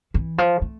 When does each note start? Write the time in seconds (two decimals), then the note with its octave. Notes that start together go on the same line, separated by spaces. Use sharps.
0.14 E3
0.38 F3
0.62 A3